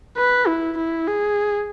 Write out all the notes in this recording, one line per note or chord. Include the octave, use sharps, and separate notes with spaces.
B4
E4
E4
G#4